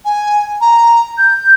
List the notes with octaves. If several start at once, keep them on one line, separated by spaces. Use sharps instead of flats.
G#5
A#5
G6